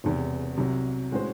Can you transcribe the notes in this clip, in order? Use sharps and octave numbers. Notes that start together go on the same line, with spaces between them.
E1 E2 C3
C2 C3 F#3
A2 G#3 C#4 F#4 C5